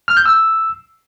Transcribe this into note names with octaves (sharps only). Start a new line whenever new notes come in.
F6
G6
E6